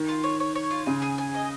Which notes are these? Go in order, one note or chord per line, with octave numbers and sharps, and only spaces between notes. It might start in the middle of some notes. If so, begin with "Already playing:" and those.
Already playing: D#3
F4
C#5
C#5
C#5
F4
C#3 G#5
G#4
G#5
D#5